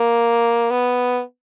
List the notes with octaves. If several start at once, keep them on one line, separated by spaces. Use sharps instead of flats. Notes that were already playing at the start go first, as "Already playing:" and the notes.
Already playing: A#3
B3